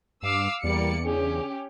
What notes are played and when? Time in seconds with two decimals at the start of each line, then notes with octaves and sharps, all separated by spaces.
0.23 G2 F5 D6 E6
0.64 E2 G3 A#3 D5 C#7
1.04 C#3 C#4 D4 G4 G#4